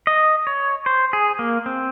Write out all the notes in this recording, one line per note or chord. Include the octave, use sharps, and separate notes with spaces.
D#5
C#5
C5
G#4
A#3
C4